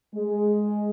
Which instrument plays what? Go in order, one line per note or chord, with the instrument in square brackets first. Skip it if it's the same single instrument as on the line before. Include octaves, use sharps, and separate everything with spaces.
[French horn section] G#3